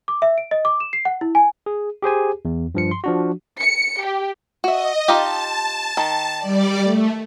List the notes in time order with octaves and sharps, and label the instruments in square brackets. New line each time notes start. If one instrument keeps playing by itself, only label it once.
[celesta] D6
E5
D7
D#5
D6
E7
C7
F#5
E4
G#5
[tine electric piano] G#4
G4 G#4 C5 G#5
E2
G2 F3 C#7
C6
F3 D4 F#4
[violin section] C#7
G4
[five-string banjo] F#4 E5 [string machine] D#5
[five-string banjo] D#4 F4 G4 [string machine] A5
[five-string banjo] D#3
[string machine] G3 D5
A3